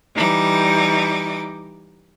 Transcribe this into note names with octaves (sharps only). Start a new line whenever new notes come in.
E3 G3 D#4 D6